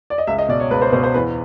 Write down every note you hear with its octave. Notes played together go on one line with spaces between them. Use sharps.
D5
D#5
C#2 E5
D#5
B2 D5
C#5
C#2 B4
C5
B2 C5
C5
E2 B4